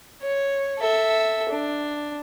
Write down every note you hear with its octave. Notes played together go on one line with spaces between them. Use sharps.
C#5
A4 E5
D4